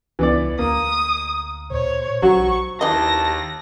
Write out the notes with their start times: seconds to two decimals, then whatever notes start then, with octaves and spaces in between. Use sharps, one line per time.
0.19 C#2 E3 B3 D5
0.59 D2 A#3 D#6
1.71 A#2 C5 C#5
2.22 A#1 F#3 F#4 C#6
2.81 D#2 E3 D#5 A5 A#6